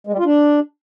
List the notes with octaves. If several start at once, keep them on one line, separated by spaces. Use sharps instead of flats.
G#3
G3
F4
D4